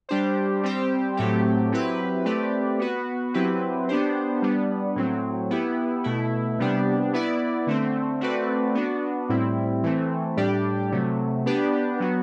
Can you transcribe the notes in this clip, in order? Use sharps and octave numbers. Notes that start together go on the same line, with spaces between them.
G3 D4 G4 C5
G3 C4 G4 C5
A2 F#3 A3 C4 G4
F#3 C4 E4 G4 B4
A3 C4 G4 B4 D5
B3 F#4 B4
F#3 C4 E4 G4 B4
B3 D4 G4 C5
G3 B3 D4
A2 F#3 C4
B3 E4 G4
B2 A3 E4
C3 G3 B3 D4 G4
B3 E4 B4 D5
D3 A3 C4
A3 C4 F#4 B4 D5
B3 D4 F#4
A2 G3 C4 E4
E3 A3 C4
A2 G3 D4 G4 D5
C3 F#3 A3
B3 D4 G4 B4 D5
F#3 B3 F#4